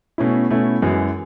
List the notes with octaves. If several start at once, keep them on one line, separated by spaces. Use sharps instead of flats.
B2 A3 C#4 E4
B2 A3 C#4 E4
F#2 E3 G#3